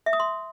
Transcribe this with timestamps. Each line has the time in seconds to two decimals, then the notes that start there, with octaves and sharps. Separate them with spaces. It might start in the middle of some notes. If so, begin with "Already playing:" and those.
0.06 E5
0.13 D#6
0.20 C6